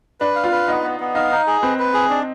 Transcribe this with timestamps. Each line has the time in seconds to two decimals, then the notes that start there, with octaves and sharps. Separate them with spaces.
0.20 D4 B4
0.36 F5
0.44 F4
0.52 B4
0.68 B3 D#4
0.83 B3
1.00 B3
1.15 D#4 F5
1.31 D#4
1.47 G#4
1.62 C4 B4
1.79 B4
1.94 G#4
2.10 D4